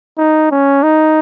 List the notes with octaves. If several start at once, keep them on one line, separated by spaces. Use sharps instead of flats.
D#4
C#4
D#4